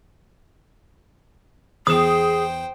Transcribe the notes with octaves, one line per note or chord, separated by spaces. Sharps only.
E2 G#4 C5 G5 D#6 E7